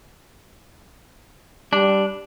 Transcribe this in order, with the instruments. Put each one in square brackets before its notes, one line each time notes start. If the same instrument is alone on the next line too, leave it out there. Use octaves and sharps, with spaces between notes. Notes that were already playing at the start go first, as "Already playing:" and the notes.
[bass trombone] G3 [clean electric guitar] D4